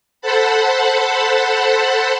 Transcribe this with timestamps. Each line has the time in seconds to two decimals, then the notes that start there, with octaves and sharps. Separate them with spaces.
0.21 A4 C5 F#5 A5 B5